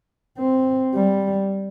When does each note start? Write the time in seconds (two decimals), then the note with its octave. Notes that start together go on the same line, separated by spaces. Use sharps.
0.38 C4
0.94 G3